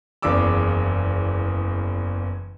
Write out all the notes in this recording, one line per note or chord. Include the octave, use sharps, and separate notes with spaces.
F#1 E2 C#3 D5 D6 E6